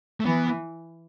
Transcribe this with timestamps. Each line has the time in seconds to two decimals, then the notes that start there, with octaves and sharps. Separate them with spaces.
0.20 A3
0.25 E3 B3